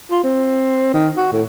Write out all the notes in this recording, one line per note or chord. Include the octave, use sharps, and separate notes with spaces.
F4
C4
D#3
F#4
A2